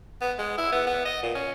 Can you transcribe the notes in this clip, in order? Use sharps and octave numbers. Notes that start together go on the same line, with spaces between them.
B3
G#3
E4
B3
B3
D#5
A#2
C#4